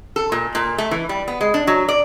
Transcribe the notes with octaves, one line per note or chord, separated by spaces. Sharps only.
A4
A#2
A#2
A3
E3
G3
B3
G#3
D4
F#3
D5